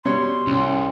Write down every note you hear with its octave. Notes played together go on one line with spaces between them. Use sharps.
B2 G3 C#5 C6
C2 C#4